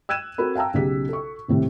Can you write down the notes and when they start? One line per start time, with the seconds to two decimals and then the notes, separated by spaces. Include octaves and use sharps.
0.09 E6 F#6 G#6 D#7 E7
0.38 C4 F#4 A4 A#4 B5
0.55 F5 G5 A5 A#5 E6
0.74 B1 C#3 G4 B6
1.09 A4 C#6
1.48 D#1 A2 C3 C4